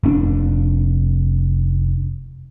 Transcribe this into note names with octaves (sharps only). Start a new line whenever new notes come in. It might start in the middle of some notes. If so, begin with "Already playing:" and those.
F1 C#4 D4